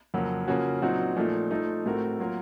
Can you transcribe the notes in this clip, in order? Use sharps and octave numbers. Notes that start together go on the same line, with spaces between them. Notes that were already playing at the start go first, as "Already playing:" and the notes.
F2 C#3 F#3 A#3
C#3 F3 A#3 C#4 F#4
A#2 F#3 C4 D#4 F#4
A#2 F3 A3 D#4
F3 A3 D#4
A2 A3 C4 F#4 A#4
F#3 A#3 F4 A#4